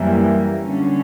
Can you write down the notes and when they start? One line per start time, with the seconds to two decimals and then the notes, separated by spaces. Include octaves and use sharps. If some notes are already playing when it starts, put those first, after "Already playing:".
Already playing: F#2 E3 G3 A#3
0.62 D3 G3 C#4